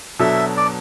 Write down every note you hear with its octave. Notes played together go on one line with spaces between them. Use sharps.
B2 F#3 D4 A4 E5
D5